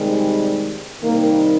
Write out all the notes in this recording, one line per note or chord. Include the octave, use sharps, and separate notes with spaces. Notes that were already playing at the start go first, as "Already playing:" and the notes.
Already playing: C3 D#3 G3 G#3
C3 D#3 G3 A#3